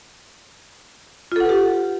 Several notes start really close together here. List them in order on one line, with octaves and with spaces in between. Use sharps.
F4 A4 F#5 B4 G4